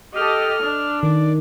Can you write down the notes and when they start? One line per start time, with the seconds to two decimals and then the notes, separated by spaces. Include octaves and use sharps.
0.16 G4 A4 D#5 F6
0.64 D4
1.03 D#3 D5